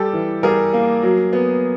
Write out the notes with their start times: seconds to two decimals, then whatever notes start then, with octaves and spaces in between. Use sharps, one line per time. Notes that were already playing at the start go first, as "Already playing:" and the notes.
Already playing: G3 G4 A4
0.13 E3
0.43 G3 G#4 A#4
0.73 A#3
1.03 F#3
1.33 B3